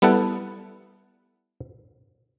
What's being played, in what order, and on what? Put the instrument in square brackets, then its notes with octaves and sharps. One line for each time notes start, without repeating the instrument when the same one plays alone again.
[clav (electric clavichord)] G3 B3 E4 A4 F#5